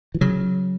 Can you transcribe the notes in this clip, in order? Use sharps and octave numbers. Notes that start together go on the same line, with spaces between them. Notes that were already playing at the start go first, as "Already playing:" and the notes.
E3
C#3 F#3